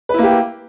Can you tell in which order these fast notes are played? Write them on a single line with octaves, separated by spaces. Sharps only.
B4 E4 A#3 G4